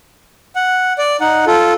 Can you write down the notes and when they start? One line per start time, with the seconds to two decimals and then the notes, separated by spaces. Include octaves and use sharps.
0.56 F#5
0.98 D5
1.21 D#4 F#5
1.47 F4 A4